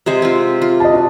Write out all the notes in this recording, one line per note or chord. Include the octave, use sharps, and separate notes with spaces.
C3 G#3 C5
C4 F4
F4
D#5 A5
F#4